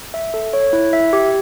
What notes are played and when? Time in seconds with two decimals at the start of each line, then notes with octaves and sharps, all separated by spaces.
0.14 E5
0.34 A4
0.53 C#5
0.73 E4
0.93 E5
1.13 G4